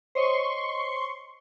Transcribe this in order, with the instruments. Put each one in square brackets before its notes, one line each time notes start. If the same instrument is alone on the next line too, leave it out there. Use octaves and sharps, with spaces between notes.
[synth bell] C5 C#5 D#5 [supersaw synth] C6 C#6